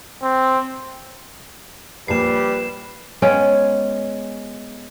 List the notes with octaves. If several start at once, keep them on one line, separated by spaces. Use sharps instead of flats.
C4
A#1 A#2 G3 B4 C7 E7
G#3 B3 C#4 G5